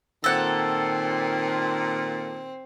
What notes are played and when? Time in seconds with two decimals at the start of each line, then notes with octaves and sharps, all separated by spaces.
0.24 A#2 D#3 C4 A4 F#5